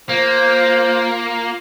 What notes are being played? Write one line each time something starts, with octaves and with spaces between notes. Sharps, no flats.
A#3 F4 C5